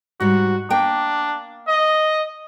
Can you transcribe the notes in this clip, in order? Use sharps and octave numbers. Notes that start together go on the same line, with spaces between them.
G#2 G3 F#4
A#3 D4 G5
D#5